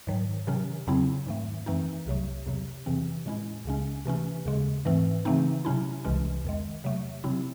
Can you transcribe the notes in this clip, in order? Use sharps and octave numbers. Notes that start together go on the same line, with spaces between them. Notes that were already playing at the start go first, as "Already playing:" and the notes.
G#2 D#3 F#3
C3 D#3 F#3 C#4
E2 C#3 F#3 C4 E4
G#2 D#3 A3
F#2 E3 A3 C4 D#4
C2 C3 F#3 A3
E2 C3 F#3
E2 C3 E3 C4
A2 G#3 C#4 E4
C#2 C#3 G#3 C#4
C3 E3 A3 C#4
D#2 C#3 G#3
G#2 E3 A3 C4
C#3 E3 A3 C4 D#4
C3 F#3 C#4 E4
C2 C3 E3 G#3 C#4
E2 D#3 G#3
C3 F#3 A3
C3 F#3 C4 E4